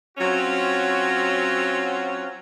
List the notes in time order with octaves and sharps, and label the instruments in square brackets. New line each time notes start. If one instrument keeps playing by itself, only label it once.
[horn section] F#3 C4 C#4 F4 F#4